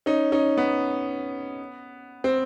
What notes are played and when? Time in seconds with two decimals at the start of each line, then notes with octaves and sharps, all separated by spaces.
0.06 C#4 D#4
0.32 C#4 D#4
0.57 B3
2.24 C4